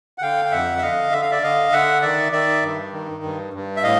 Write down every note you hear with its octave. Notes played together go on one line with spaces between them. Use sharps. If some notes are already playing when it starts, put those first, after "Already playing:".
F#5
D3 F5 G5
G5
F2 E5 F#5
E5
D3 D#5 F5
D3 E5
F5
D5 E5
D3 D#5 F5
D3 E5 F#5
D#3 D5 E5
D#3 D5 E5
G2
D#3
G2
G2
E5
A2 D#5 F5